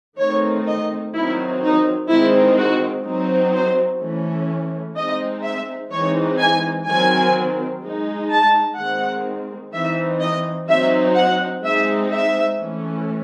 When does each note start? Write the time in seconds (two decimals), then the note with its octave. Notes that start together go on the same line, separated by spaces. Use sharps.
0.18 D#3 A3 C4 D#4 C#5
0.66 D#5
1.14 D#3 F#3 C4 D#4 E4
1.61 D#4
2.09 D#3 G#3 C4 D#4 E4
2.57 F#4
3.05 F#3 C4 D#4
3.53 C5
4.00 E3 A3 C#4
4.96 G#3 C4 D#4 D#5
5.44 E5
5.91 E3 G#3 C4 D#4 C#5
6.39 G#5
6.87 D#3 F#3 C4 G#5
7.82 G#3 D#4
8.30 A5
8.78 D#3 G#3 C4 F#5
9.73 E3 C4 D#4 E5
10.20 D#5
10.68 F#3 C4 D#4 E5
11.16 F#5
11.64 G#3 C4 D#4 E5
12.11 E5
12.59 E3 A3 C#4